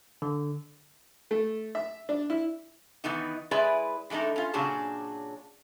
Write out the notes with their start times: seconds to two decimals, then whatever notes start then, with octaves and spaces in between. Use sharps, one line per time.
0.22 D3
1.31 A3
1.75 E5
2.09 D4
2.30 E4
3.04 D#3 E3 B3 D#4
3.51 G#3 E4 G#4 B4 D5 E5
4.10 E3 G#3 A3 D4 D#4
4.36 C#4 F4
4.54 A#2 C#3 F#3 D4 G#4 A5